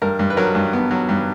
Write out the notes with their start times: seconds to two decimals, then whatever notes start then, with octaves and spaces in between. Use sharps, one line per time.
0.02 G2 A#4
0.19 G2
0.30 B4
0.37 F#3 A#4
0.55 G2
0.73 B3
0.91 F#3
1.09 G2